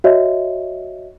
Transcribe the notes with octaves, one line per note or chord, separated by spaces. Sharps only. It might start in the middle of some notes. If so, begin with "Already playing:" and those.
F#4 C#5 D#5 E5